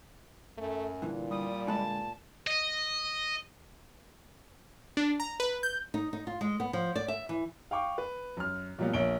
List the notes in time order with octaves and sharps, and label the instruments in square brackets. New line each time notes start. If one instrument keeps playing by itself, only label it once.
[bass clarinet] F#2 [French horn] A3
[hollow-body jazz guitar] G2 D3 E3 [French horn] A#2
[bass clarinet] G3 [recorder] D#6
[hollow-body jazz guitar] D3 G#3 B5 [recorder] A5
[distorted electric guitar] D#5
[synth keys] D4
A#5
B4
G6
[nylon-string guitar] D#4
D#4
F4
G#3
B3
F3
D5
E5
E3
[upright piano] F5 G5 C#6 D6
B4
F#2 F6
A#2 F#3 G3 A#3 B3
A#1 A#3 C#5 D7 G7